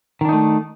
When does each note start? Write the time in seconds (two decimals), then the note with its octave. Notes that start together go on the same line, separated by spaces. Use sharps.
0.21 D#3
0.25 D4
0.29 D#4
0.33 A3